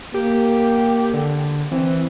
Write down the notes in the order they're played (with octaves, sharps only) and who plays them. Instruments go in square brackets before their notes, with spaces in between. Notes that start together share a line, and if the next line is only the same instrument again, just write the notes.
[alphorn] A#3 [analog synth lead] G4
[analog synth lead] D3
[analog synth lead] E3 [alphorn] C4